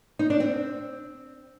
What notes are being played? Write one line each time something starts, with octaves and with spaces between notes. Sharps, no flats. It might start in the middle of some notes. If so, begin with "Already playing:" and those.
D#4
D4
C4